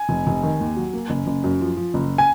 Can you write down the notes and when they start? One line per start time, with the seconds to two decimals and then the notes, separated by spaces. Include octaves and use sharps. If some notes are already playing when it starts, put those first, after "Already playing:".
Already playing: G#5
0.09 F1
0.27 F1
0.43 D#3
0.60 D#2
0.77 F#3
0.93 A#3
1.10 F#1
1.27 F#1
1.44 F#2
1.61 F3
1.77 F3
1.94 F#1
2.18 G#5